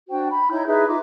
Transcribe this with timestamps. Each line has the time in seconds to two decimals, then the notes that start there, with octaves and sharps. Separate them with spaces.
0.09 D4 F#4 C5 G5
0.29 B5
0.50 D#4 E4 C#5 G6
0.66 D#4 G#4 B4 E5
0.88 D#4 F4 D6